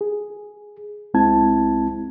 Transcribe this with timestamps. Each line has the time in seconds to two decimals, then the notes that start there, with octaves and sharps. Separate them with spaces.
0.01 G#4
1.14 C2 G#3 C4 E4 A5 G#6